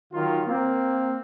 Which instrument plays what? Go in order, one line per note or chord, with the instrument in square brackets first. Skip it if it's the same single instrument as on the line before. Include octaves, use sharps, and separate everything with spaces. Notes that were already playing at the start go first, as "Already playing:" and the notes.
[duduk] D#3 [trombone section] F#3 D#4 F4
[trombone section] A#3 [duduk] C4